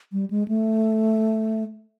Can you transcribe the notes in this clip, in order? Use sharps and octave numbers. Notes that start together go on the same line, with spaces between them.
G3
G#3
A3